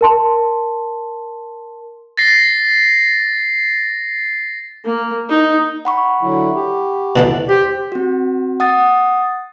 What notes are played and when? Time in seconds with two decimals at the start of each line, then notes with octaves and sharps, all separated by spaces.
0.01 A#4 A5 C6
2.17 A6 A#6 C7
4.85 A#3
5.29 D#4
5.85 F#5 B5 C#6
6.22 D3 F#3 E4
6.55 G4
7.16 B2 D3 E3
7.49 G4 C5 G5
7.92 C4 F#4
8.60 F#5 D#6 A6